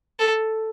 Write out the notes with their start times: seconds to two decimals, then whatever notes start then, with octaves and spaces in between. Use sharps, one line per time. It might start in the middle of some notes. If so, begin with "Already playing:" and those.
0.20 A4